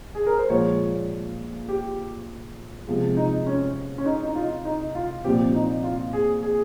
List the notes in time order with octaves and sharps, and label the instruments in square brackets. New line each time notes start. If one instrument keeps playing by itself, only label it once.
[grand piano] G#4
A#4
C5
[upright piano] A#2 F3 G#3 [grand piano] C#5
[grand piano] G4
[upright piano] C3 F3 G#3
[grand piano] D#4
C#4
C#4
D#4
D#4
F4
D#4
F4
[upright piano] A#2 F3 C4 [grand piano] G4
[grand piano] D#4
F4
G#4
G#4